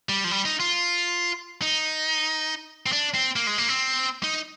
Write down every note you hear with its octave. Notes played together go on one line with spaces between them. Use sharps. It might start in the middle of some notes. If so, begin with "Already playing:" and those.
G3
F3
G3
D#4
F4
D#4
C4
D4
C4
A#3
G#3
A#3
C4
D#4